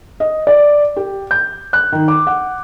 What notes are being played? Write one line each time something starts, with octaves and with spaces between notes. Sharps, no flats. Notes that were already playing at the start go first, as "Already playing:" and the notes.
D#5
D5
G4
G6
F#6
D#3
D6
F#5